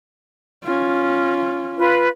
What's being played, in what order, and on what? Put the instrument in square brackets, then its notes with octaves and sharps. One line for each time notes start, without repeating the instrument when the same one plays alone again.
[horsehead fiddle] C#4 F4
[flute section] F4 B4